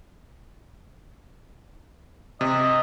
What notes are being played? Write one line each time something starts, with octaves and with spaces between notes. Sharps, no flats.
C3 D#5